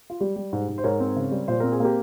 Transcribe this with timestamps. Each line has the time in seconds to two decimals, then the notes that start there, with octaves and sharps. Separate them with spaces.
0.10 F4
0.20 G3 G4
0.36 G3
0.53 G#2
0.68 G#2
0.78 C5
0.84 G#2 A#4 C#5
1.00 C4
1.16 C#3
1.31 G3
1.48 A#2 C5
1.60 C4 A#4
1.72 G#4
1.80 A#3 G4 A#4